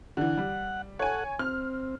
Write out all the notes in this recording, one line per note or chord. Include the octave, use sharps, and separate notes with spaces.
D3 E3 F#5
G3
A4 C#5 F#5 G#5
C4 F6